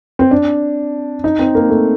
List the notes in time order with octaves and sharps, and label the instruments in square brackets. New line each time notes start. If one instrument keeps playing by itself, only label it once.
[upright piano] C4
D4
D#4
C4
A#3
A3